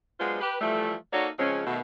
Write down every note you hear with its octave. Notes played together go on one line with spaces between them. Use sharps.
F#3 G#3 B3 D4 F4 C5
G4 B4
E3 F3 G3 A3
A#3 D#4 F#4 A4 C#5 D5
C#3 F3 G#3 C4 C#4
B2 D#3 A3